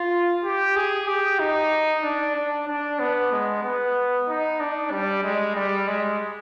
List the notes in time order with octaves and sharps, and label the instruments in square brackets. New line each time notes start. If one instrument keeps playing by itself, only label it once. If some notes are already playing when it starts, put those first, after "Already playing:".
Already playing: [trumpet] F4
G4
G#4
G4
D#4
D4
D4
D4
B3
G#3
B3
D#4
D4
G3
G#3
G3
G#3